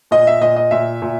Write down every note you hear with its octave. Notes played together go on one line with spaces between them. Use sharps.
A#2 D#5
E5
A#2 D#5
D#5
A#2 E5
A#2